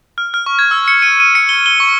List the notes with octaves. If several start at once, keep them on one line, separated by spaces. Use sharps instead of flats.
F6
F6
C#6
G#6
E6
C#7
D#7
D#7
C#7
G7
G7
C#6